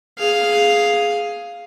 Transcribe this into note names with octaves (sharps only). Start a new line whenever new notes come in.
G#4 F5